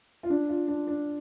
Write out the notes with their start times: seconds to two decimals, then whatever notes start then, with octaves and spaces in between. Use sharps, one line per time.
0.23 F4
0.30 D4
0.49 F4
0.68 D4
0.87 D4